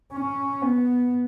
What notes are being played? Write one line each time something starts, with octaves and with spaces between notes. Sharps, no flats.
C#4
B3